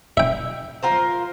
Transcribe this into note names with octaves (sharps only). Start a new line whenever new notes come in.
E5 G5
F4 A#4 C5